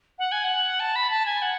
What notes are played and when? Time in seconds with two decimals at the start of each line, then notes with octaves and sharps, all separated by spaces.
0.19 F#5
0.32 G#5
0.44 F#5
0.80 A5
0.96 B5
1.10 A5
1.26 G#5
1.42 F#5